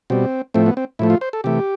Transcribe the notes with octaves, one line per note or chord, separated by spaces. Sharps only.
B2 G3 C4
A2 F3 A3 C4
B3
C4
A2 F3 A3 E4
F4
C5
A4
C3 E3 A3 G4